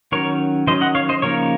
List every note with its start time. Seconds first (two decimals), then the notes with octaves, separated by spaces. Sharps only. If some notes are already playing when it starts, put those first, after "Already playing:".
0.12 D#3 F#3 C#4 A#4 C#5
0.67 D#3 F#3 C#4 C5 D#5
0.81 D#5 F#5
0.95 C#5 F5
1.09 C5 D#5
1.22 C#3 F3 A#3 D#4 A#4 C#5